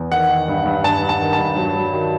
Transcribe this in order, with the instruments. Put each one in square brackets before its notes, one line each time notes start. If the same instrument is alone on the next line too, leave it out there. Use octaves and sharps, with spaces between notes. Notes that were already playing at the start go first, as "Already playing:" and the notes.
Already playing: [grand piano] E2
D#3 F#5
D#3
G2
G2
G2 A5
G2
A5
D#3
A5
G2
F#3
F#3
D#3